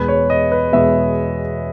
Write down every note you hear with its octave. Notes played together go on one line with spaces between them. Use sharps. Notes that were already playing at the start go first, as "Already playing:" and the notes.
Already playing: E2 B2 G#3 B3 B4
C#5
D#5
B4
E2 B2 G#3 B3 E5